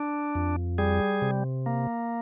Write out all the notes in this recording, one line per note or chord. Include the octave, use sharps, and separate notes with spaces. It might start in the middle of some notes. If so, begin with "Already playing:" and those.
Already playing: D4
F2
G3 G#4
C3
A#3